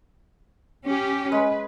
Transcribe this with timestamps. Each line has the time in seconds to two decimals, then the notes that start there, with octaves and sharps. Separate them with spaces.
0.86 C#4 G4
1.32 G#3 B4